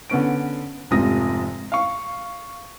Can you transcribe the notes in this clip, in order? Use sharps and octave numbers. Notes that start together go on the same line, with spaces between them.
D3 B3 C#4 D7
F1 G#2 C3 F3 D#6 A#6
F5 C#6